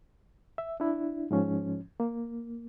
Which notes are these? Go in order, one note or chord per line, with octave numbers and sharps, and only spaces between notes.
E5
D4 E4
G#2 F3 C#4
A#3